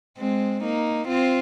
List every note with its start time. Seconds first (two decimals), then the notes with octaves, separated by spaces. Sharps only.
0.18 G#3 C4
0.64 A#3 D#4
1.08 C4 F4